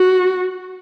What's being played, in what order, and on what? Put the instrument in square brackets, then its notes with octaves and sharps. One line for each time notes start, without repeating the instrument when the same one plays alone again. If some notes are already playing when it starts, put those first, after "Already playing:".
Already playing: [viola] F#4